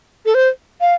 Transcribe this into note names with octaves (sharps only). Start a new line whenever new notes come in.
A4
C5
F5